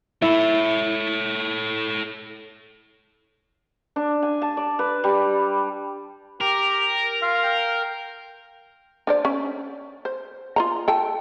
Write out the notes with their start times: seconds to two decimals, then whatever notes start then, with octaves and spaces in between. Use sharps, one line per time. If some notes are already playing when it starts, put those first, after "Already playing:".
0.22 E4 A4 C#5
3.96 D4
4.23 G#5
4.42 A5
4.57 D5
4.79 B4
5.04 G3
6.41 G4 A#4
7.22 F4 F5
7.44 G5
9.07 D4 C5 D5
9.25 C#4
10.05 C5
10.56 F4 D#5 A#5
10.88 A4 G5 A5